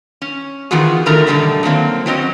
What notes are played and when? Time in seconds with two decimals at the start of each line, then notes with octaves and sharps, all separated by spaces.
0.22 C#4
0.71 D#3 E3 B3 F4 F#4 G#4
1.06 A2 D3 D#3 A3 A#4 A#5
1.27 F#2 B2 D3 D#3 G3 A3
1.63 D#3 F#3 A#3 C4
2.06 F#3 C4 C#4 D#5